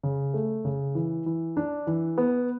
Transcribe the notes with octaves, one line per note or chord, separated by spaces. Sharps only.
C#3
A3
C#3
E3
E3
D4
E3
B3